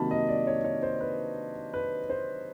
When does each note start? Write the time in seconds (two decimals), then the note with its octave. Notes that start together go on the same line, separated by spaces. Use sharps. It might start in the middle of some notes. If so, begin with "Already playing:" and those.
Already playing: C3 D#3 F#3 A#3 A5 B5
0.11 D#5
0.28 D5
0.47 C#5
0.65 C#5
0.83 C5
1.01 B4
1.74 B4
2.10 C5